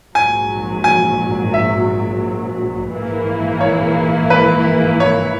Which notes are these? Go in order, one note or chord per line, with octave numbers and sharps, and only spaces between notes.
A#1 G#2 F#3 G#5
G#5
E5
A#1 G#2 E3 A#3 E4
C#5
B4
C#5